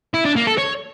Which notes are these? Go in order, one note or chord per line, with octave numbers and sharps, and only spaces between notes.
E4
D4
A#3
A4
C#5